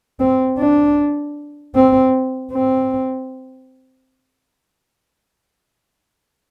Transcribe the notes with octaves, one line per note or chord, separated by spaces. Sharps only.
C4
D4
C4
C4